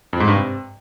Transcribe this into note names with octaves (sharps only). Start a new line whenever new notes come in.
F2
G#2
G2
C3